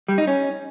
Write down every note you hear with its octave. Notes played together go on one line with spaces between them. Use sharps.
G3
D#4
C#4